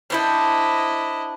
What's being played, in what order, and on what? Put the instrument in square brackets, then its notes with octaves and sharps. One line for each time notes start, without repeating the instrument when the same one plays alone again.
[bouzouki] D4 C5 F#5 [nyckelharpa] E4 D#5